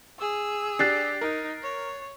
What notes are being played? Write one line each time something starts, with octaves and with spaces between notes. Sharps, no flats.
G#4 E6
D4 G4 F#6 A6 C7
D#4 A#4
C#5